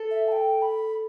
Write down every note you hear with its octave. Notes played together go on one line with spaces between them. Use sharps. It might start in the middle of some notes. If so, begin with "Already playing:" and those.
Already playing: A4
E5
A5
G5
B5